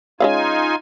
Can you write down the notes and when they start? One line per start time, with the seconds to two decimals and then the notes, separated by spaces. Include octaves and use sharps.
0.20 G#3 C#4 D#4 F4 F5 G#5